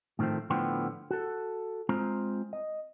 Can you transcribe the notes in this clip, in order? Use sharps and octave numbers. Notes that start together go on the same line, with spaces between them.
A2 D#3 F3 A3 C4
A2 D3 F3 B3 G5 C6
F#4 A4
G#3 C4 F4 C5 A#5
D#5